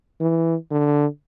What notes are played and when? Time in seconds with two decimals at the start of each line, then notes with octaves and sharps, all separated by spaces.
0.20 E3
0.71 D3